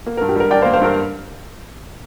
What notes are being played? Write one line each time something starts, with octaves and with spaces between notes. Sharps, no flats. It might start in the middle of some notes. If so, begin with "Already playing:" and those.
A#3
A#4
G2
G4
G3 A#4
D4 D5 G5
C5 F5
A#3
C5 F5
G2 A#4